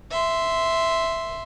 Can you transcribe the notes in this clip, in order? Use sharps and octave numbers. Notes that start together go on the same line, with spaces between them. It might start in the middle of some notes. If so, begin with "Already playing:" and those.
E5 C6